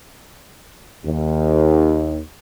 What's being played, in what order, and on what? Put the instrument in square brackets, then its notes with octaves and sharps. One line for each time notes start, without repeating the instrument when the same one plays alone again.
[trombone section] D#2